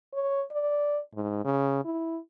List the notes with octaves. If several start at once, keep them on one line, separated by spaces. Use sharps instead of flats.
C#5
D5
G#2
C#3
E4